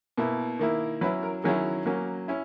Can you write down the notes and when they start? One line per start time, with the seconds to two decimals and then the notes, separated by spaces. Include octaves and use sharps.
0.18 B2 A#3 E4
0.59 D#3 A#3 E4
1.01 F#3 C#4 E4 B4
1.23 A#4
1.43 D#3 F#3 C#4 E4 G#4
1.86 F#3 A#3 C#4
2.28 C#4 E4